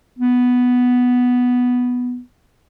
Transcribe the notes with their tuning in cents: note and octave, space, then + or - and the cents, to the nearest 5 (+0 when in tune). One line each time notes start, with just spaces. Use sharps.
B3 +0